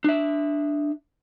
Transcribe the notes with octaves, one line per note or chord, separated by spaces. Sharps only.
D4 E5